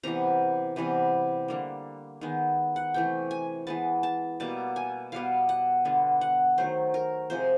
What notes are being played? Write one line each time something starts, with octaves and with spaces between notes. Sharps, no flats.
C3 E3 G3 B3 A#5
C3 E3 G3 B3
D3 G3 A#3
D#3 G#3 B3
F#5
C3 E3 A3 G5
G#5
E3 G#3 B3 A5
A5
B2 G3 A#3 A5
G#5
B2 G3 B3 F5
F#5
D3 G3 B3
F#5
D#3 F#3 A3 C5
A#4
C3 F3 G#3 C5